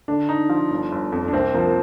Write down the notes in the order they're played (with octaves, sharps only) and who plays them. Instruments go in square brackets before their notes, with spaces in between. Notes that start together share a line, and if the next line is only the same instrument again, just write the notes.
[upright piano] D3 [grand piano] D4
[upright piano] D#4
F3
G1
G1
F2
[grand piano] D4
[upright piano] C2 [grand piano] C4
[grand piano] F3 [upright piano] A#3